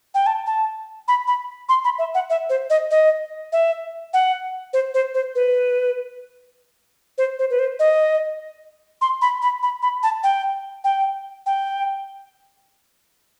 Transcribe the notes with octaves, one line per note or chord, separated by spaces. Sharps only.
G5
A5
A5
B5
B5
C6
B5
E5
F#5
E5
C5
D#5
D#5
E5
F#5
C5
C5
C5
B4
C5
C5
B4
C5
D#5
C6
B5
B5
B5
B5
A5
G5
G5
G5